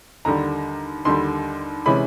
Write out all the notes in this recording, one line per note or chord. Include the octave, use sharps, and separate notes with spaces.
D#2 D3 G3 A#5
D#2 D3 G3 C6
C3 E3 G#3 C#4 B5